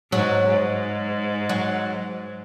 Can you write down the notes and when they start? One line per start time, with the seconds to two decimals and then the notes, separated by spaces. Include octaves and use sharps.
0.12 G#2 F#3
0.47 G#2
1.49 F#3